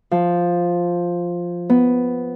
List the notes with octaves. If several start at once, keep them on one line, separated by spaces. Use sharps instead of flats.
F3
B3